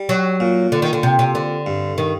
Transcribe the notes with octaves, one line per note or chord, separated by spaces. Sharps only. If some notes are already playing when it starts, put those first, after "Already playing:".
Already playing: G3
F#3
A#2
D3
D#3
D3
C3
C3
D3
G2
D#3